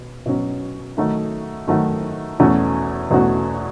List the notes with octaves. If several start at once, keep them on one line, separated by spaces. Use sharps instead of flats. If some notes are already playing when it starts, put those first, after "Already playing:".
Already playing: B2
B2 F#3 C#4
D#3 F#3 A3 D#4 F#4
D#3 F#3 A3 D#4 F#4
E2 B2 A3 C#4 F#4
E2 B2 A3 C#4 F#4